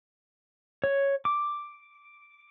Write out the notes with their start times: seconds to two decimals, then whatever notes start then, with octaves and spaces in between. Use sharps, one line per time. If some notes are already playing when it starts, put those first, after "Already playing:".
0.84 C#5
1.25 D6